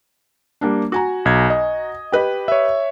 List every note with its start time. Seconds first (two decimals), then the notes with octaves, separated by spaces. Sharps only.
0.61 G3 A#3 D4
0.92 F#4 G#5 A#5
1.25 B1 G#6
1.50 D#5
2.12 G4 B4 D#5
2.48 C#5 E5